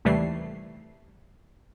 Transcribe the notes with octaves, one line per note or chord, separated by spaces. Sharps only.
D#2 C3 E3 G3 A3 C7